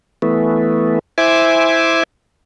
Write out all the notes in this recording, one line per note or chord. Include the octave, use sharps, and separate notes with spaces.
E3 A3 B3
E4 C5 E5 G#5 D6